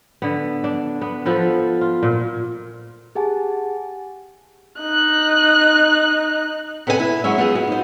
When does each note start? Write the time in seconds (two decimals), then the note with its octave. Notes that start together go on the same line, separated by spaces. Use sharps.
0.22 D3 B3
0.64 D4
1.01 B3
1.25 F3 B3 A4 B4
1.81 F4
2.03 A#2
3.15 G4 G#4 F#5 G#5 A5
4.80 D#4 F#6
6.87 C3 B3 C4 A4 C5 G#5
6.99 E4 E5
7.24 F#3 G#3 C#4 E5
7.38 B3 D#4 F4 G#4
7.55 F#4
7.68 D#4 C5